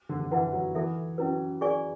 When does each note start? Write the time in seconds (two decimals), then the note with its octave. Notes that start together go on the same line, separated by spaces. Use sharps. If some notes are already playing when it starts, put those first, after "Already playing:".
0.09 D3
0.20 D3
0.31 E3 E4 B4 F#5
0.46 E3
0.52 F#3
0.75 E3 E4 A4 E5
1.18 F#3 C#4 E4 B4
1.61 G#4 D5 G#5 C#6